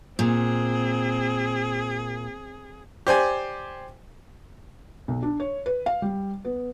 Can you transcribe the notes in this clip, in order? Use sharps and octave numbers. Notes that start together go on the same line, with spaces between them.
A#2 C4 G#4
G4 C5 D5 G#5
B1
D4
C#5
B4
F5
G3
B3